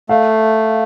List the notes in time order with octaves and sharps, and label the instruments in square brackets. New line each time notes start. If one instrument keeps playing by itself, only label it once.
[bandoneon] A3 [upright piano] F5